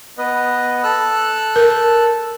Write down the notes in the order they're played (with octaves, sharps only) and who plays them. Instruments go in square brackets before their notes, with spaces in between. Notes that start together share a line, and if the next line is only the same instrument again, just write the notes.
[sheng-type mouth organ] B3 B4 D#5
A4 E6 F#6
[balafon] A#4